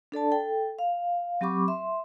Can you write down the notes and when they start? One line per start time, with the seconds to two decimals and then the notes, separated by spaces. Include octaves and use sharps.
0.12 D4 A4 D5 A5
0.32 A4 G5
0.79 F5
1.41 F#3 C4 G4 B5 C#6 D6
1.68 E5 C6